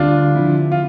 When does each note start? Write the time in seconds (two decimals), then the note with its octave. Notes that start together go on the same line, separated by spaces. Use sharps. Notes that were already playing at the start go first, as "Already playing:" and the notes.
Already playing: D2 D3 G3 C4 D4 F4
0.36 D3 F3 C4 E4
0.72 F4